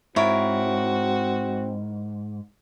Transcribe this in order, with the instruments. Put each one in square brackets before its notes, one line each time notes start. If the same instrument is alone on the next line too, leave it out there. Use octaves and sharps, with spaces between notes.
[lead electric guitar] G#2 [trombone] C4 [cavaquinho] E4 A#4 C#5 [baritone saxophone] F#4